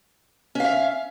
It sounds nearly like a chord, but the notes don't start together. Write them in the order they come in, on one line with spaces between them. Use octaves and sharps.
C#4 F5 E5